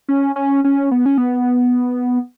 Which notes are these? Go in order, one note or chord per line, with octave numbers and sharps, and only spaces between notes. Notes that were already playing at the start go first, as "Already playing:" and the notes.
C#4
C#4
C#4
B3
C#4
B3